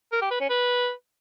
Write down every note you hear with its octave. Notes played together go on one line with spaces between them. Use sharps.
A#4
G4
B4
C#4
B4